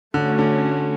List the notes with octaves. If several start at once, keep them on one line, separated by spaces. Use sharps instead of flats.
D3 A3 C#4 F#4
D3